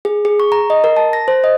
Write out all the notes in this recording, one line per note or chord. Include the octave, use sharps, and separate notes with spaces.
G#4
G#4
C#6
A#5
D#5
A#4
A5
A#6
C5
D#5